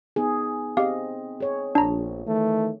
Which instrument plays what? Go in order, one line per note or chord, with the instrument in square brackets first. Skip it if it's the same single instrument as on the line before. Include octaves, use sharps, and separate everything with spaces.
[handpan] B3 D#4 G#4
[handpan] C4 G#4 D#5 [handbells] G4 F5
[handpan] G#4 C#5
[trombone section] A#1 [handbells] D4 A#5
[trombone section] D#3 E3 A3